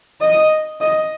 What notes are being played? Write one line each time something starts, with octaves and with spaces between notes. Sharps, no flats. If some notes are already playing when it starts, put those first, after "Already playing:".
D#5
D#5